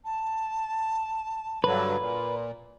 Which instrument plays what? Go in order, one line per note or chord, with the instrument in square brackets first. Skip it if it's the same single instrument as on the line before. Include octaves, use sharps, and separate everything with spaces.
[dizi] A5
[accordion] G2 D3 F#3 [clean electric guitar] B4
[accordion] A#2